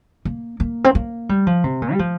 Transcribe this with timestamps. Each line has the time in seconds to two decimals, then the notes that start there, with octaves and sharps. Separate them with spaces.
0.25 A#3
0.60 A#3
0.84 C4
0.95 A#3
1.29 G3
1.47 F3
1.64 C3
1.82 A#2
1.92 G3
1.99 F3